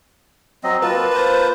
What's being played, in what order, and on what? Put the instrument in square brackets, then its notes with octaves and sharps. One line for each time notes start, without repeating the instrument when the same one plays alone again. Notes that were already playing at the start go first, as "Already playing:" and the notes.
[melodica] F#3 C4 D#5
[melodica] A#3 F4 A5 [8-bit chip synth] B4
[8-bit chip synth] B4 C5